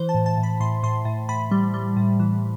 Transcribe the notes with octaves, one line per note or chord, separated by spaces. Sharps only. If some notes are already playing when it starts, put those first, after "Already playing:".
Already playing: E3 C5
A5
A2
A5
A2
B5
A2 C6
A2 C6
A2
A2 B5
G3
G3
A2
E3